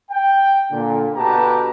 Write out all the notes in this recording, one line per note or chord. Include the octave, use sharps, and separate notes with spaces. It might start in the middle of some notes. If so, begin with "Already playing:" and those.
G5
A#2 D3
B2 D3 G4 B4 A5 A#5